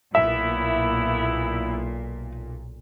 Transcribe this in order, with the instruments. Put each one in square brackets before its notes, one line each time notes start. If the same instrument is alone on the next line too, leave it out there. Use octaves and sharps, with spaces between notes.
[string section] B1 A#2 [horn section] A#3 B3 E4 [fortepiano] E5